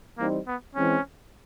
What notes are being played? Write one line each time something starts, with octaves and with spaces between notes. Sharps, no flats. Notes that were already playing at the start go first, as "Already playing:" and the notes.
E3 G3 A#3 C4 D#4
B3
E3 G#3 C4 C#4